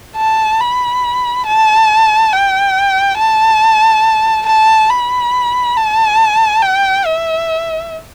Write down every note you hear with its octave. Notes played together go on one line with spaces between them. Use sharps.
A5
B5
A5
G5
A5
A5
B5
A5
G5
E5